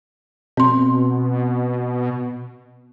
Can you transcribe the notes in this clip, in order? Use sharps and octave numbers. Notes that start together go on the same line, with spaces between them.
B2 C4 C6